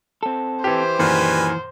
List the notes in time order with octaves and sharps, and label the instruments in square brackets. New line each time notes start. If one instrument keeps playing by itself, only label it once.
[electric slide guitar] C4 A4
[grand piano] E3 G4 [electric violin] C5
[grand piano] F#2 A#2 D#3 [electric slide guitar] E3 [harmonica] G3 B4 G#5